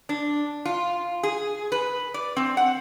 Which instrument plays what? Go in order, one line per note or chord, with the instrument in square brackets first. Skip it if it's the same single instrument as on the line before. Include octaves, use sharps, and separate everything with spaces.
[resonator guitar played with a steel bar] D4
F4
G#4
B4
D5
C4
F#5